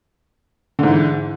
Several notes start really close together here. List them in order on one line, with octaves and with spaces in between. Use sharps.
D3 G#2 E3